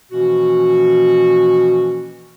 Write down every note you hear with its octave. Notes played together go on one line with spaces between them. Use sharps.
B2 E3 F3 A#3 C#4 F#4